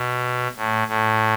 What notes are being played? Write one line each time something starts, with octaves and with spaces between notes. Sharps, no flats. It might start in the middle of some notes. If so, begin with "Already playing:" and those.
Already playing: B2
A2
A2